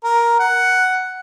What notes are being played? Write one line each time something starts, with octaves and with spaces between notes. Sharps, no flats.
A#4
F#5